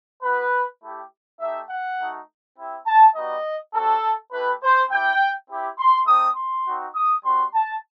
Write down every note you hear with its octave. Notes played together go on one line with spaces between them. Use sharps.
B3 F#4 B4
A3 E4 G4
A3 D#4 G4 E5
F#5
A3 D#4 F#4
C4 E4 G4
A5
G3 B3 D#4 F#4 D#5
G3 C4 F#4 A4
A3 E4 G4 B4
C5
C4 E4 G4 G5
C4 E4 G4
C6
A3 C4 D#4 D#6
C6
C4 D#4 F#4
D#6
G3 C4 F#4 C6
A5